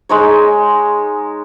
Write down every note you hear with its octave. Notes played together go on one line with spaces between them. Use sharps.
G#3 D#4 C#5